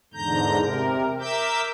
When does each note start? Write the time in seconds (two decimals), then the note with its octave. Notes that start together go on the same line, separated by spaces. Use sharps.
0.13 E2 G#2 D3 A#5 G6
0.59 C3 A#4
1.20 A#4 E5 D6 E6 G6